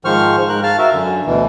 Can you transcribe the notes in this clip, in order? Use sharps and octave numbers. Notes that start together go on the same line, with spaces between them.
G#2 D#3 F3 C5 C#6 F6
G#2 A#4 F#6
F5 A5 F6
F#4 A#4 E5
F#2 D3
D2 B2 E3